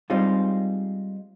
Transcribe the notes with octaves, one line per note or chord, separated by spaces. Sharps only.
G3 G#3 C4 D#4 F4